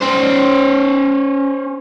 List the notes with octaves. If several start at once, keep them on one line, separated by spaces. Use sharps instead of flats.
C#4 C5